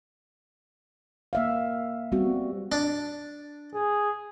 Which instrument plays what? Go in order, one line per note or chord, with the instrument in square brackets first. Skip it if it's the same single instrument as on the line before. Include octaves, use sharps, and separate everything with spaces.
[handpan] A#3 E5 F5
G3 B3 C4 F#4
[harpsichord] D4
[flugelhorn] G#4